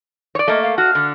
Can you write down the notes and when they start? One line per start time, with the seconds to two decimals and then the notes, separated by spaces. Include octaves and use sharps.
0.35 C#5 D5
0.48 A3 A#3 D#5
0.63 F5
0.78 F#4 F6
0.95 D3